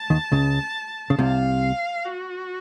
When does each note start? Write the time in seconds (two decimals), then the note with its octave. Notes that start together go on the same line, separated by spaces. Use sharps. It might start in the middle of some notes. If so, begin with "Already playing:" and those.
Already playing: A5
0.10 D#2 D#3
0.32 C#2 C#3
1.10 C#3
1.19 C2 C3 F5
2.05 F#4